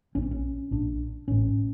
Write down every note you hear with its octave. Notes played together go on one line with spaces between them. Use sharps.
A#1 A#2 C#4
C4
C#4
A#1 A#2 D4
A1 A2 C#4